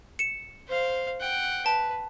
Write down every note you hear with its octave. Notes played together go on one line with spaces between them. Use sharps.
C#7 E7
C5 F5
F#5 G5
B4 A5